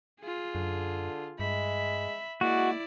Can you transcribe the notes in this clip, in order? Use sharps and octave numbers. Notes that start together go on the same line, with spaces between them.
F4 G#4
F#2 D3
G2 G#3 E5 B5
G#3 A#3 E4 F#4 D5